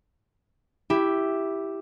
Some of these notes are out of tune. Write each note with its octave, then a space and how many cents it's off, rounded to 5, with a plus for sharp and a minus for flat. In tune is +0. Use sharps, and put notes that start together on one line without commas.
E4 +0 G4 +0